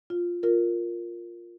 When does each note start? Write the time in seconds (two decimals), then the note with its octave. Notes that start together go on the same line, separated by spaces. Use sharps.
0.10 F4
0.43 F4 A#4